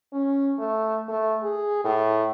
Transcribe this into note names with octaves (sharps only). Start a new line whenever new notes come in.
C#4
A3
A3
G#4
A2